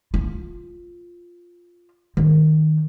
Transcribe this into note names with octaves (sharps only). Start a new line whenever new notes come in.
F4
D#3